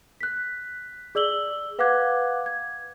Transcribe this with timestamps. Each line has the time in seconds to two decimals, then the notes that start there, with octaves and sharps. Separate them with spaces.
0.21 F#6 B6
1.15 G#4 D5 E6 F#7 G7
1.79 B4 F5 F#5 D6 F#6 G#6
2.46 G#6